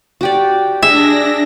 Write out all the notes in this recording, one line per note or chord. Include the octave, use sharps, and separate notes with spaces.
F#4 G4 D5
D4 G#4 E5 A#6